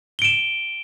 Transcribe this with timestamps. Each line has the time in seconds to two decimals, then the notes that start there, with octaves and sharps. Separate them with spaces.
0.19 G7
0.22 D7
0.24 E7